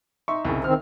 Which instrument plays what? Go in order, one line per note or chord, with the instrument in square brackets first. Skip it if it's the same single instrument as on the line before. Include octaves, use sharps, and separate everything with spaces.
[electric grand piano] D#4 E5 C#6 [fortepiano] C6
[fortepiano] C2 C#3
[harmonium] D#3 C4 [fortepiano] F6